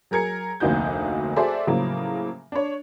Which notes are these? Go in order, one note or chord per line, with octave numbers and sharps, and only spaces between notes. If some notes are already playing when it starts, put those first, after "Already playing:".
F#3 G#4 A#4 G#6 C#7
F1 D2 A#3 D#4 F#4 G6
F#4 G#4 A4 C5 D5 E5
A2 C#3 F3 F#3 A#3
D4 C#5